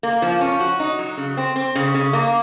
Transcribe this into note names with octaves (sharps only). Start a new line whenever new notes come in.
A#3
F3
C#4
F#4
D#4
F#3
C#3
C4
C4
C#3
C#3
A#3